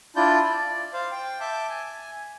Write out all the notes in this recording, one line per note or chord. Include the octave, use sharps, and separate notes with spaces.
D4 E4 F4 D5 G6
D5
C5 F5
G5
E5 A5 D6 G6
G#5